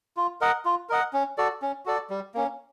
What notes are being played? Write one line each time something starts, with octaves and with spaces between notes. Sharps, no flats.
F4
A#4 D#5 F#5
F4
A#4 D#5 F#5
C#4
F#4 A4 D5
C#4
F#4 A4 D5
G3
A#3 C#4